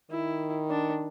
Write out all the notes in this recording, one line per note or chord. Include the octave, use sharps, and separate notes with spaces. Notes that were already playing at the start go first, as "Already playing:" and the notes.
D#3 E4
D4